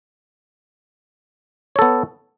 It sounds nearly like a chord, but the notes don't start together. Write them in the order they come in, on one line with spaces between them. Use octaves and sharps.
C#5 A4 B3